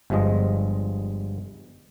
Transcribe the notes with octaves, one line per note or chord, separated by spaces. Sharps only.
G1 G2 F3 G#3 D#5